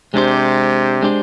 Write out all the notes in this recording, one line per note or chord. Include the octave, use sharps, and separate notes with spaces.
C3 G#3 D4 G4 C5
G#3 D4 G4 C5